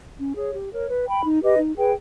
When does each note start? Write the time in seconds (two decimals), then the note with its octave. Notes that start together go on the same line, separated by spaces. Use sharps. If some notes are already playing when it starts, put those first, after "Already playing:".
0.19 C#4
0.36 G#4 C#5
0.54 G4
0.72 A#4 C#5
0.89 B4
1.06 G5 B5
1.24 D#4
1.42 G4 B4 D#5
1.59 D#4
1.76 G#4 B4 G5